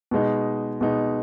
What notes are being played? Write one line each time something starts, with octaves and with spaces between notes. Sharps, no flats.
B2 G#3 D#4
B2 G#3 D#4